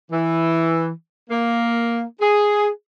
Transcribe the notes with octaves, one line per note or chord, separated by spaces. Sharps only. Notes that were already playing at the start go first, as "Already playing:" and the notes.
E3
A#3
G#4